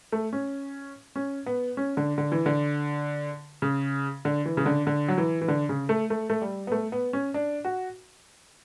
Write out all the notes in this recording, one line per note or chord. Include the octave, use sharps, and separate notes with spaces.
A3
C#4
C#4
B3
C#4
D3
D3
E3
D3
C#3
D3
E3
C#3
D3
D3
F#3
E3
E3
D3
C#3
A3
A3
A3
G3
B3
A3
B3
C#4
D4
F#4